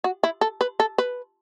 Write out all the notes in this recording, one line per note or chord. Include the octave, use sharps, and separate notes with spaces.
F#4
E4
A4
B4
A4
B4